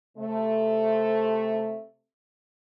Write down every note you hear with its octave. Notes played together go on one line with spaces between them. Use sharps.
C3 A3